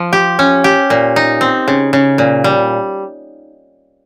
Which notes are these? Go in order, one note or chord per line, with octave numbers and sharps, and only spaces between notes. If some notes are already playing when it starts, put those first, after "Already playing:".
Already playing: F3
G4
C#4
G4
A#2
D#4
C4
C#3
C#3
A#2
G3